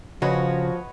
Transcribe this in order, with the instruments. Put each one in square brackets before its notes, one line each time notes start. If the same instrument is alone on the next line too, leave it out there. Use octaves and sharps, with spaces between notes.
[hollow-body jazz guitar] C#3 [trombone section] F3 [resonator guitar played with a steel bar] F#4 [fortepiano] B4 C#5 D#5